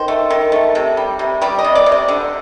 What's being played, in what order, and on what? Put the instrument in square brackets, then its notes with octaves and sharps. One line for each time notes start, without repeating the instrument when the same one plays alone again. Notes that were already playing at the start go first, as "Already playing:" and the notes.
Already playing: [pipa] D#3 C5
A3
D#3
A3
C3
G3
C3
G3 D5
D#5
C3
D5
C3
C5
D3